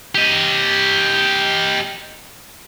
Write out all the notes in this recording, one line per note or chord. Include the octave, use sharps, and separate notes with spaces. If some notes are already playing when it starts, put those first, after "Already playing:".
G4 D#5